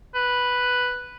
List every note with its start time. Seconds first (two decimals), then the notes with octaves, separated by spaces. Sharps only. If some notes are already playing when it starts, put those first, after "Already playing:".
0.15 B4